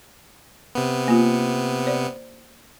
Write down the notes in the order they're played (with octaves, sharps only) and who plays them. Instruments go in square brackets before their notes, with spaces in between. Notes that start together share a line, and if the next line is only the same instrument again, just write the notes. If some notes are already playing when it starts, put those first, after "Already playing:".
[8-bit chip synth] C3 B3
[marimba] A#3 F4
C5 D5